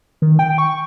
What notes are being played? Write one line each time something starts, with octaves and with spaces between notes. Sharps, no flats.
D#3
G5
C#6